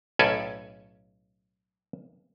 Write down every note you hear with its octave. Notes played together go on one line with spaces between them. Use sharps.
B1 A2 C#4 A4 D5 G#5